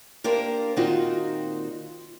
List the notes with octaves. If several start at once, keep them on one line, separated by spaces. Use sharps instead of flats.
A#3 D4 G4 A#4 C5
A#2 D#3 C4 D#4 F4 F#4